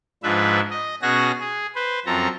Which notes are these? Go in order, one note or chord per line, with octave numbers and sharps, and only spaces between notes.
G#2 F3 D4 B4 E5
D#5
B2 C#4 F#4 G#4 F#5 A#6
G#4
B4 C5
F#2 F3 C4 A4 A#5